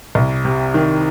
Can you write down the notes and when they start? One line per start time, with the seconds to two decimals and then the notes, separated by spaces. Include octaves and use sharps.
0.15 C2
0.45 C3
0.74 D#3